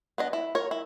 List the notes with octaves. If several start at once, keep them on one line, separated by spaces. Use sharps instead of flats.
B3 D4 D#5
E4
A#4 C#5
E4